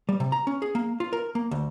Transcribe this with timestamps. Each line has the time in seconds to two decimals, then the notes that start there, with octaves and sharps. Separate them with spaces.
0.09 G3
0.20 C3
0.32 A#5
0.47 C#4
0.62 G#4
0.75 A#3
1.00 F4
1.13 A#4
1.35 A#3
1.51 D2